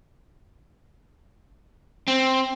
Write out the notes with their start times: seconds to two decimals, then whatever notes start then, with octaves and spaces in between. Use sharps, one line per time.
2.08 C4